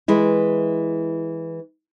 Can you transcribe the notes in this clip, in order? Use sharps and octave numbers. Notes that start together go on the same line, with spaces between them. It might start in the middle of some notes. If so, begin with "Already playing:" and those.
E3 G#3 E4